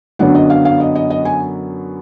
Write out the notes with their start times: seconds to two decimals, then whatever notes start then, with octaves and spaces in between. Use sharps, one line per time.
0.19 F#2 D3 F#3 B3 D4 F#5
0.35 D#5
0.50 F5
0.65 F5
0.80 D#5
0.95 D#5
1.10 D#5
1.25 G#5